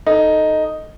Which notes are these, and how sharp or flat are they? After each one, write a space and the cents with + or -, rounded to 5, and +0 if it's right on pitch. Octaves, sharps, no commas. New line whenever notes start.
D#4 +0 A4 +5